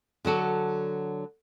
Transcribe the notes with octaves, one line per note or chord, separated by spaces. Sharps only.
D3 F#3 F#4 A4